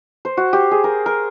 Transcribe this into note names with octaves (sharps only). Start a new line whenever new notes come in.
C5
F#4
G4
G#4
A#4
A#4